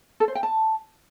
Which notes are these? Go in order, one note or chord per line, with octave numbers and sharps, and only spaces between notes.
A4
C5
G5
A5